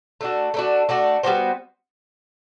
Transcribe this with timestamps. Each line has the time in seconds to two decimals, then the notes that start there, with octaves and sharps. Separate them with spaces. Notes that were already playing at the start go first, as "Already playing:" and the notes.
0.21 A3 D4 F#4
0.54 A3 D4 F#4
0.89 A3 D4 F#4
1.23 G3 B3 F#4 C5